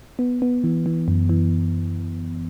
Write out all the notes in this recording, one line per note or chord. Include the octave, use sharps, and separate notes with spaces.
B3
B3
E3
E3
F#2
E3